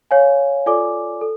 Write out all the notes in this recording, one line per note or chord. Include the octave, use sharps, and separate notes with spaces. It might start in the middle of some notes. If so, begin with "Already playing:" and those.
C#5 F5 G#5
F4 A4 D5 G#5 D6
A4